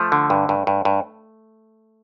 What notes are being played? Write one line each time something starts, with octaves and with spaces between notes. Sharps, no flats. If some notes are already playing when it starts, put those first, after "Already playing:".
Already playing: F3 A3
D3
G2
G2
G2
G2